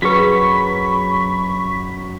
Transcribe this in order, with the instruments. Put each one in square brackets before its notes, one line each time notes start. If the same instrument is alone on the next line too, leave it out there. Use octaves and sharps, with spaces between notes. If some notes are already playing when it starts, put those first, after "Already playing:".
[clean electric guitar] F#2 F#3 [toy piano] F#4 G#4 B4 [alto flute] B5 [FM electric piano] C#6 B6